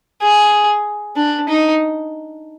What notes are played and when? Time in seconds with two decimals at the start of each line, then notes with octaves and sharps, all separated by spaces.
0.22 G#4
1.16 D4
1.48 D#4